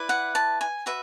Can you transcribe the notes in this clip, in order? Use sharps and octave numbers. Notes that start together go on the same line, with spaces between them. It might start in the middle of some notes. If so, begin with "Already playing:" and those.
Already playing: E4 B4 D5
F#5
A5
G#5
F#4 B4 E5